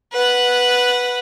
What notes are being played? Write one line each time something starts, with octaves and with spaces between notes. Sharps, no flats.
B4 F#5